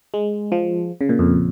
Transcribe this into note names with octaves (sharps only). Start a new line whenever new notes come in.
G#3
F3
C#3
A#2
F2